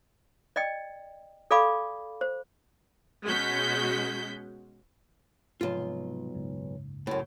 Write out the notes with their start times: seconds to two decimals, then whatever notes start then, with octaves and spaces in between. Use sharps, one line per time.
0.56 D5 D#5 G5
1.51 A4 D5 F5 G#5 B5 D6
2.21 C5
3.24 B2 G#3 C#4 F#4 G6 B6
5.61 B1 G#2 C3 F3 F4
6.34 F#1 C#2 G#2
7.07 F#2 A2